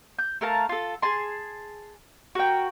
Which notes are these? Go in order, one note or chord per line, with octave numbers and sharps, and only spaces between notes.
G6
A3 A#4 F5 A5
F4 A4
G#4 G#5 A5 C6
F#4 A#4 G5